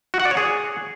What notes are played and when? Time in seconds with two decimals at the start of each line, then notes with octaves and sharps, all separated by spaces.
0.14 F#4
0.20 F#5
0.25 D5
0.31 C#5
0.37 G#4